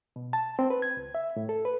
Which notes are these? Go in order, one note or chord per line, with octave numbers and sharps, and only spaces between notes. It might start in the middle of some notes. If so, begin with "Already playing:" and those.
B2
A5
C4
B4
G#6
C#2
E5
A2
A4
B4